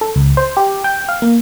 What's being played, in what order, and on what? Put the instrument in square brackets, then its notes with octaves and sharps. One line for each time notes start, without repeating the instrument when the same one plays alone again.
[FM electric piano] A4
C#2
C5
G4
G5
F5
A#3